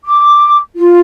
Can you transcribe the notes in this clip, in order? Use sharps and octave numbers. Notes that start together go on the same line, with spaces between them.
D6
F4